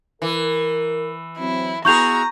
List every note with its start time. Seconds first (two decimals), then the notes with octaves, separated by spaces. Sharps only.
0.22 E3 A#4
1.38 F#3 C4 E4
1.85 B3 E4 F#4 G#4 A#5 C#6 G6 F7